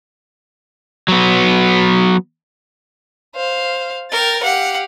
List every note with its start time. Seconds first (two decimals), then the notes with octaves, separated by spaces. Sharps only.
1.08 F#3 B3
3.36 C5 F5
4.11 A#4 G5 A6
4.42 G4 F5 F#5